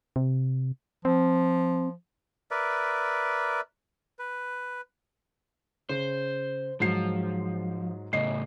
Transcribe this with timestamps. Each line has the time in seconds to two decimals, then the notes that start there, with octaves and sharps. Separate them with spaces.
0.16 C3
1.05 F3 C4
2.51 A#4 B4 D5 E5
4.19 B4
5.89 C#3 C5
6.80 G#2 F3 F#3 C7
8.13 A2 C#3 D#5 C7